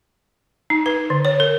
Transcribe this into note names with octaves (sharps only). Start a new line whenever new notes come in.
D#4
B4
D3
C#5
A#4